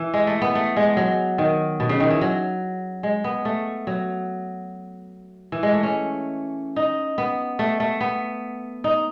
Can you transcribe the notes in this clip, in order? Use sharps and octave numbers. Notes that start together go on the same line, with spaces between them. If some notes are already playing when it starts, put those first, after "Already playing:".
Already playing: E3
G#3
A3
B3
A3
G#3
F#3
D#3
B2
C#3
D#3
E3
F#3
G#3
B3
A3
F#3
E3
G#3
A3
C#4
D#4
B3
A3
A3
B3
D#4